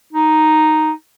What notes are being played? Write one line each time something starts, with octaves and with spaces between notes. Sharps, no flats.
D#4